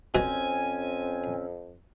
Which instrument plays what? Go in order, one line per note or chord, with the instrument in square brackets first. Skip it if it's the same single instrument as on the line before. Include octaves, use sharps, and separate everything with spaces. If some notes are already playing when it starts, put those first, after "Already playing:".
[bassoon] F2 [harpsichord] B2 F#4 [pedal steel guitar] C4 C#4 [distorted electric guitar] G#5